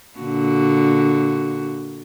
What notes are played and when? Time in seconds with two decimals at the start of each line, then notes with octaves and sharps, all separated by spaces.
0.19 A#2 D3 F#4